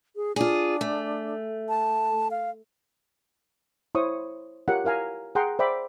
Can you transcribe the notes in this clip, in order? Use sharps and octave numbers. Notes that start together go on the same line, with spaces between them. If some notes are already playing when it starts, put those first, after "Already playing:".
G#4
D4 F4 G#4
A3
A5
F5
E4 C5 C#5 C#6 D#6
F4 G4 A#4 C#5 F#5
E4 A#4 F5 G#5 A#5
G#4 F#5 G5 A#5 C6
C5 D5 E5 G5 B5 D6